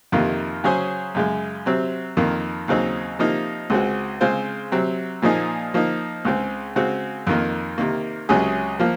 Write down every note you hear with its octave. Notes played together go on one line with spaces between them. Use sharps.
F2 C3 D#3 A#3 F4
C#3 F#3 C#4 G#4 C5
F#2 C#3 G#3
C3 F#3 C4
F2 D#3 A#3
D#2 C#3 F#3 C4 D#4
C3 F3 A#3 D#4
C#2 C#3 G#3 C4 F#4
C#3 G#3 C4 F4 C5
C3 F#3 C4
A#2 F3 A#3 D#4 G#4
F3 A#3 D#4
C#2 C#3 G#3 C4
C#3 G#3 C4 F#4
F2 D#3 A#3
C3 D#3 A#3
C#2 C3 F#3 C#4 G#4
F3 A#3